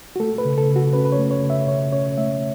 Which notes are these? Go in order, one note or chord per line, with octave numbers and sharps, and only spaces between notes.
F#4
A3 A4
B4
C#3
A4
C#3
F#4
C#4 B4
B4
C#5
A3
C#5
C#3
E5
C#3 C#5
C#4 C#5
A3 E5